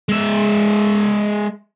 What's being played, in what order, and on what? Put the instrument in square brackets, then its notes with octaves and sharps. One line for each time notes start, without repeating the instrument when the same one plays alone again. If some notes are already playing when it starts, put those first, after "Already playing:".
[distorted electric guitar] G#3 E5